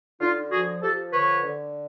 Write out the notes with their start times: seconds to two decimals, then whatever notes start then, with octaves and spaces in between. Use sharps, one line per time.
0.20 D3 D#4 F4
0.51 F3 F#4 G#4
0.82 F3 G4 A4
1.12 D3 B4 C#5
1.44 D3